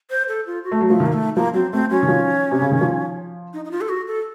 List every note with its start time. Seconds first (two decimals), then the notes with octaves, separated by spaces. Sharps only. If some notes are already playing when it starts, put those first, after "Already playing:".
0.10 C5
0.28 A4
0.47 F4
0.64 F#4
0.72 A3
0.81 F#3
0.88 F3 A3
1.00 D#3
1.06 A#3
1.13 A3
1.36 F3 A#3
1.54 F#3 C4
1.73 A3 C4
1.90 F#3 C#4
2.03 D#3
2.08 F3
2.51 C3
2.61 C#3
2.71 D#3
2.81 F3
3.53 D#4
3.65 D#4
3.71 F4
3.81 A4
3.89 F#4
4.07 A4